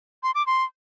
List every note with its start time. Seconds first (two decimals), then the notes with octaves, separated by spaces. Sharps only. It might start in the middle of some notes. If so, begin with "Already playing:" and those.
0.23 C6
0.35 D6
0.46 C6